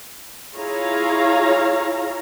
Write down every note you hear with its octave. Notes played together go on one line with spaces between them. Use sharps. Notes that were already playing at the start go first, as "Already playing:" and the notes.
E4 F4 G#4 C#5 F5 A#5